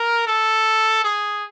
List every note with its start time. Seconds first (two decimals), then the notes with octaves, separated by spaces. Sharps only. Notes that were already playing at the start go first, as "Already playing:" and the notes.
Already playing: A#4
0.27 A4
1.04 G#4